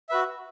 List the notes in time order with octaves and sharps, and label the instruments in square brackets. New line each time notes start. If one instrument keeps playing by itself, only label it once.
[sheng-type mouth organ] F#4 B4 E5